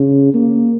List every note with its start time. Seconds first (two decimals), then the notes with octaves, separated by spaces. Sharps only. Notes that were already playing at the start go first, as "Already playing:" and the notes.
Already playing: C#3
0.34 A#3